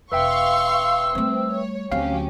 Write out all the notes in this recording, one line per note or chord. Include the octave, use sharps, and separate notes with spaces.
E1 B4 E5 F5 G5 C6 C#6 E6
G3 A3 C4
C#5
D2 F#3 C4 C#4 G4 F5